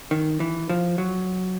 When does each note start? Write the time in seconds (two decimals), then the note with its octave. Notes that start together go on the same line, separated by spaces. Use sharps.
0.11 D#3
0.40 E3
0.69 F3
0.98 F#3